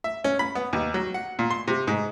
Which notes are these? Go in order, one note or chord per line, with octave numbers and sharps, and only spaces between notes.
E5
C#4
B5
B3
D#2
F#3
F#5
A#2
C6
C3
G#2